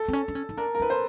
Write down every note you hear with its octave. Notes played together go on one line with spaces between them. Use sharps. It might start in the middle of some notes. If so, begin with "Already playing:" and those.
Already playing: A4
C4
C#4
D4
C#4
D#4
D4 A#4
A#4
D#4 B4
C5